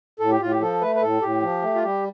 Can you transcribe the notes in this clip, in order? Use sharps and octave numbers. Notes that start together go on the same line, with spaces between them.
A2 A4
G4
A2 F4
G4
F3 A4
A3 B4
B4
A2 A4
A2 G4
F3
A3
F4
G3 G4